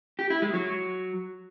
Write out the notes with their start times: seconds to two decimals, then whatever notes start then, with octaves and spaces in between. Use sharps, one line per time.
0.19 G4
0.30 E4
0.42 G#3
0.54 F#3